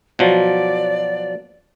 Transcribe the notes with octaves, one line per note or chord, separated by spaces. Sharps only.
B2 F3 F#3 D5